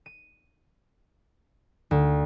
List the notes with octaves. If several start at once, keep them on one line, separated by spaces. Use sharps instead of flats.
D#7
D2